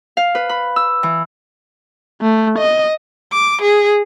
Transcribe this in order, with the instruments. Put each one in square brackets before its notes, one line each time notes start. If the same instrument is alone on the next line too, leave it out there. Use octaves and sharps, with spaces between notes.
[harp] F5
B4
B5
E6
E3
[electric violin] A3
D#5
[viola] D6
G#4